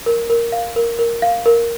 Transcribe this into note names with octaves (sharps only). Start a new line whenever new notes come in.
A#4
A#4
F5
A#4
A#4
F5
A#4